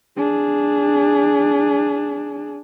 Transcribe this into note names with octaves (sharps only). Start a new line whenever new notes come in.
D4 G#4